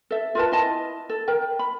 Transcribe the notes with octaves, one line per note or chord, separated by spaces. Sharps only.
A4 E5
F4 A#4 B4 A5
E4 D#5 A5
A4
A#4 G5
B5